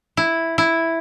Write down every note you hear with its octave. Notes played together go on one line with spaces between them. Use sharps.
E4
E4